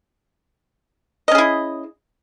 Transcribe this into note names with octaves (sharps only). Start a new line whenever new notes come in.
C#4 E4 G#4 D#5